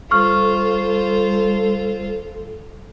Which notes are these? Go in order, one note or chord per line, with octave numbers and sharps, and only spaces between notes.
G3 F4 A4 C5 C#6 F6